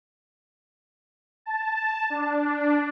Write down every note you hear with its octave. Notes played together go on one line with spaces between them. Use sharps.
A5
D4